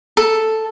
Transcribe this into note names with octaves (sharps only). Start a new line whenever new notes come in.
A4